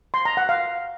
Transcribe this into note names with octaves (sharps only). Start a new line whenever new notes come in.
C6
A#5
F#5
F5